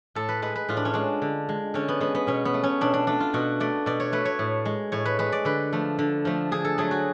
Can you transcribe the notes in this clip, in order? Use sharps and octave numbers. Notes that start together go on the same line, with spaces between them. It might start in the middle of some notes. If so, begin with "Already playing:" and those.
A2 A4
B4
G#3 B4
B4
A2 F4
D4
C#4
G#3 D4
D3
G#3
D3 C#4
B3
G#3 B3
B3
B2 C#4
B3
A3
C#4
B2 D4
D4
A3 D4
F4
B2 F#4
A3 D5
B2 D5
C#5
A3 B4
C#5
A2
G#3
A2 C#5
B4
G#3 B4
D5
D3 B4
F3 A3
D3
F3 A3
D3 G#4
A4
F#3 A3 G#4
F#4